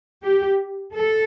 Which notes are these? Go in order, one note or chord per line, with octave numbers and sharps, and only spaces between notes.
G4
A4